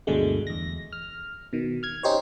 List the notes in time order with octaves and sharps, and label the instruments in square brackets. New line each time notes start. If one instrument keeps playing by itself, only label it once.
[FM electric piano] D2 G2 B2 D3 G#3 A3
E2 A#6
F6
B2 D#3
F6 G#6
C#4 D#4 G4 C5 C#5